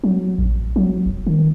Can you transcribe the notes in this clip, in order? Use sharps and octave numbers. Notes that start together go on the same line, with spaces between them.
F#3
A1
F#3
E1
D#3